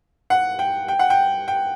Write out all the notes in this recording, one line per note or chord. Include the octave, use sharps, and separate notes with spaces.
F#5
G5
G5
F#5
G5
G5